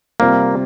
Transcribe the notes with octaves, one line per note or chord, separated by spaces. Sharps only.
C3 G3 A#3 C4 F4